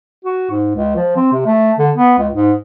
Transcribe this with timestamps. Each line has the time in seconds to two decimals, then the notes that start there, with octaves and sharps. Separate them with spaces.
0.25 F#4
0.51 G#2
0.75 C#2
0.96 F3
1.16 C4
1.32 C3
1.46 A3
1.78 D3
1.95 B3
2.19 C#2
2.33 G#2